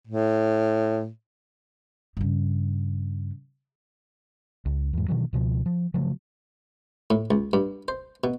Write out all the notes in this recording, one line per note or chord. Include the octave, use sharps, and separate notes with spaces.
A2
G2 C#3
C#2
E2 G#2
B2 D#3 E3 F#3
C#2 B2 F3
F3
C#3 F3 F#3 A3
A2
C#2
G2
C5
B2